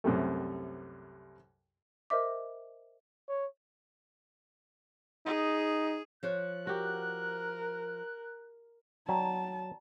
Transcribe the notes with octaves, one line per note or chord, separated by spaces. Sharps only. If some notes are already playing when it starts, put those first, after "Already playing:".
C2 F#2 C3 G3 A3
A#4 C5 D#5 E5 D6
C#5
D#4 G#4
F3 C5 C#5 F#6
F#4 G4 A#4
F#3 D5 G5 A5 A#5